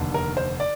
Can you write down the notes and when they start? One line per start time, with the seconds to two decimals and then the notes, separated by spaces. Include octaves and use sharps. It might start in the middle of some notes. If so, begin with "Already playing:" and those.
Already playing: F1 D#2 D3
0.14 A#4
0.37 C5
0.60 D5